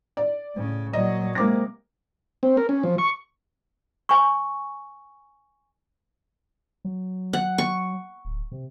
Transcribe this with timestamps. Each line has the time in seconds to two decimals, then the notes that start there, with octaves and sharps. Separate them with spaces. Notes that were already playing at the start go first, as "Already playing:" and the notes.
0.17 D5
0.56 A2 C#3
0.93 A#2 F#3 D5 D#5
1.35 C3 G#3 A#3 D6 A#6
2.43 C4
2.57 A#4
2.69 C#4
2.83 F3
2.98 C#6
4.09 G#5 C#6
6.85 F#3
7.33 F#5
7.58 C#6
8.25 D1
8.52 C3